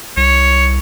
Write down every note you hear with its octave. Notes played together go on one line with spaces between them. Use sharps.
C2 C#5